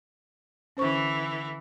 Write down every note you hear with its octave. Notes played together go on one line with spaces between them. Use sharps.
D3 E3 C#4 C5 C#6